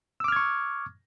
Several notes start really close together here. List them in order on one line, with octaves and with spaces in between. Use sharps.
E6 D6 F6 G#6 C#6